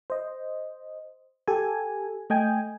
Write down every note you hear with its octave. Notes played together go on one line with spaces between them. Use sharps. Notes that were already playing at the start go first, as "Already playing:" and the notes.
C5 D#5
G4 A4 G#5
A3 D#5 G5 G#5